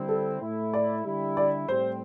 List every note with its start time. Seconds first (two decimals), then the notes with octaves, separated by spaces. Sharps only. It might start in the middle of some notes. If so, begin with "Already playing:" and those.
Already playing: D3 G3 C4 E4
0.08 A4
0.41 A2 A3 E4
0.74 D5
1.05 D3 G3 E4
1.37 D5
1.68 A2 G3 C4 C5